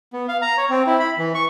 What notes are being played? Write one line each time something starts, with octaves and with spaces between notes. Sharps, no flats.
B3
F5
A#5
C#5
C4
E4
B5
E3
C#6